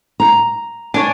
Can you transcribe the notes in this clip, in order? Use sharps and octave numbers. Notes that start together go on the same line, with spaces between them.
A#5
D4 C#5 G#5